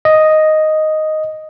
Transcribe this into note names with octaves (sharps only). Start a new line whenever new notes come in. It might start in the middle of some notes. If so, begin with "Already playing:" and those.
D#5